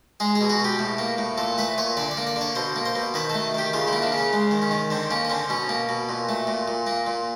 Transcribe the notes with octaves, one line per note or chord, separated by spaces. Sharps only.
G#3 G#4
G#4
B2
F#4
B2 G4
A2
A#3
A2
A#2 A4
A3 B4
A#2 C#5
D3 D5
D5
A#3
D5
D3 C#5
B2 C5
A#3
C5
B2
D#3 B4
A3 A4
D#3 G4
C#3 F4
E4
A#3
D4
C#3
C#4
G#3
D#3
C#4
D#3
D3 C4
A#3 C#4
C#4
D3 C4
B2 C#4
A#3
B2
A#2
A3
A#2
A#2
A#3
A#2